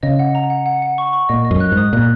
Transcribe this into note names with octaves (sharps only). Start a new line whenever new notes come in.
C#3 D#5
F#5
A#5
F#5
F#5
F#5
C#6
C#6
A#2 D#5
D#5
F#2
F#6
G#2
D#6
A#2 F#6